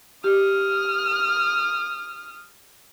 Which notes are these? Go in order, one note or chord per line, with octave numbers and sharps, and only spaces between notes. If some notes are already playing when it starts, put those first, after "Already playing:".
G4 D#6 F6